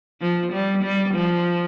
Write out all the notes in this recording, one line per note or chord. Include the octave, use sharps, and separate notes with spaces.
F3
G3
G3
F3